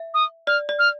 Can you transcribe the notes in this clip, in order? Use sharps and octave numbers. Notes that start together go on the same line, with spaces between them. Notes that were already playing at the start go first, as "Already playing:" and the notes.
Already playing: E5
D#6
D5 F6
D5
F6